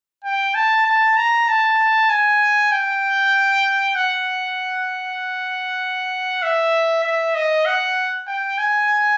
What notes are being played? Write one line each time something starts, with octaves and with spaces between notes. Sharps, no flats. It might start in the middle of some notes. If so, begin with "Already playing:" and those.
G5
A5
A5
A#5
A5
G#5
G5
F#5
E5
E5
D#5
F#5
G5
G#5